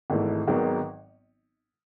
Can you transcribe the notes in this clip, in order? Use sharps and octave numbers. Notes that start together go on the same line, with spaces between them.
G#1 G#2 E3 A3
G#1 G#2 D#3 F#3 B3